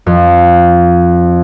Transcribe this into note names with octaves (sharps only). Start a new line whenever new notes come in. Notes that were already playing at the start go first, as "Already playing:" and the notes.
F2